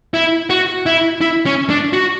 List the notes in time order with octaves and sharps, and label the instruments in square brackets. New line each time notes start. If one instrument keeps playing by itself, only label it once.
[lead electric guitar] E4
F#4
E4
E4
C#4
D4
F#4